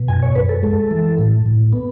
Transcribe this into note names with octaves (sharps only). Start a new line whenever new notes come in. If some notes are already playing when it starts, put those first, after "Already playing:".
Already playing: B2
F#2 G#5
C#5
F#2 B4
A4
G#3 A4
E3
A2
A2
B3